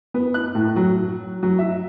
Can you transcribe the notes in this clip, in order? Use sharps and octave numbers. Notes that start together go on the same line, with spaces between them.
B3
F#6
A2
F#3
F#3
E5